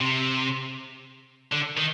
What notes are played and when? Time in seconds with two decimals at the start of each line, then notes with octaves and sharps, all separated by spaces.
0.01 C3
1.52 D3
1.77 D#3